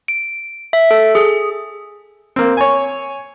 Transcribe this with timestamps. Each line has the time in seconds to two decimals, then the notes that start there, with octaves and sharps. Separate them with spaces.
0.08 D7
0.73 E5
0.91 A4
1.15 G#4
2.36 A#3 C4
2.57 C#5 G#5